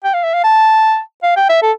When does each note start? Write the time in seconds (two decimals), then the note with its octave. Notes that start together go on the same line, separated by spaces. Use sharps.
0.04 G5
0.14 F5
0.24 E5
0.34 F5
0.44 A5
1.23 F5
1.37 G5
1.49 E5
1.62 A4